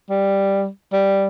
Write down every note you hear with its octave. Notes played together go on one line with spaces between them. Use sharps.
G3
G3